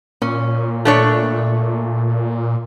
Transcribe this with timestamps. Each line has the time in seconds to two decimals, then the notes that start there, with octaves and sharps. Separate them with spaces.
0.22 A#2 C#4
0.85 A3 D4 C#5